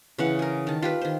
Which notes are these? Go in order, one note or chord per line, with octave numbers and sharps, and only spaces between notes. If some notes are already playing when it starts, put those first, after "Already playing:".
C#3 E3 F#5
G#4 A#4
D#3 A5
F4 G4 B4
D#3 C5